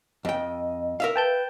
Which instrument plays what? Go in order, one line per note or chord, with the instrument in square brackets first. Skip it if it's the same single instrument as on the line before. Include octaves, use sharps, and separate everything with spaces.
[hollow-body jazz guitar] F2 G5 [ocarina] D#5
[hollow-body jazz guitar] A#4 E5 F5
[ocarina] B4 [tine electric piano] G5 A5 G6